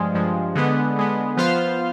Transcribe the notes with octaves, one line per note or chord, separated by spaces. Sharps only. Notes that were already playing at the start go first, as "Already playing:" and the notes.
Already playing: G2 F3 G#3
G2 F3 G#3
D3 G#3 B3
D3 G#3 B3
F3 B3 F4 C5 F5